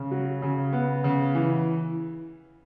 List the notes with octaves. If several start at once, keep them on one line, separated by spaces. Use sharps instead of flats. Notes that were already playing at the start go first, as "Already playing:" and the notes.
Already playing: C#3
F#3
C#3
B3
C#3
E3